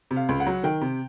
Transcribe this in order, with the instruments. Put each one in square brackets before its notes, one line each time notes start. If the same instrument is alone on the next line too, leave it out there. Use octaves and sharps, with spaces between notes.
[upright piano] C3
F5
C#2
F#5
F#3
D#3 G5
C3